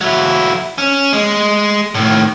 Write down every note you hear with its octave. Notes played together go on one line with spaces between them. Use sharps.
F#3 E4
C#4
G#3
A2 D#3